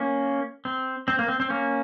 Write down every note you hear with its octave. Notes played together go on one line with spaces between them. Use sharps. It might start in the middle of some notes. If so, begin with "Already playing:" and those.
Already playing: A#3 C#4
C4
C4
A#3
C4
C4
A#3 C#4